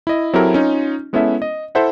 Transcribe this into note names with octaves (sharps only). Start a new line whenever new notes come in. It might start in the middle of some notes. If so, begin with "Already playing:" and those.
E4 D#5
F#3 C4 E4 G4 A4 A#4
C#4 D#4 F4
G#3 B3 C#4 E4 A4 E5
D#5
E4 A4 C5 E5 F#5